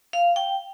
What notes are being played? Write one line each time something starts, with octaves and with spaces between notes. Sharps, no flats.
F5
G5